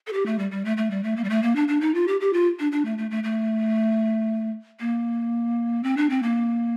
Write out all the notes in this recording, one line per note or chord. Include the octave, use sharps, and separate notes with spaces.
A4
G4
A3
G3
G3
A3
A3
G3
A3
A#3
G3
A3
A#3
D4
D4
D#4
F4
G4
G4
F4
D4
D4
A3
A3
A3
A3
A#3
C4
D4
C4
A#3